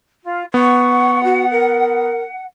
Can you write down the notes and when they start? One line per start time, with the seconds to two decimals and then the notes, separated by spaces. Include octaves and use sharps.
0.23 F4
0.54 B3 F#5 C#6
1.24 F#4
1.51 A#4